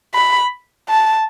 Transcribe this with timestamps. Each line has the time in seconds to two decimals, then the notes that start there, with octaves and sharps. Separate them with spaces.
0.15 B5
0.89 A5